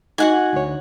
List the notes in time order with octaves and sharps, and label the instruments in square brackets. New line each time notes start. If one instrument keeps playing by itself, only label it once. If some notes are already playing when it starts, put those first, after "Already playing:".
[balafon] D#4 D#5 [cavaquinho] F#4 F#5 G#5
[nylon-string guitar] D2 C#5